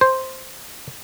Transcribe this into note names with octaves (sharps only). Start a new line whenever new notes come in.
C5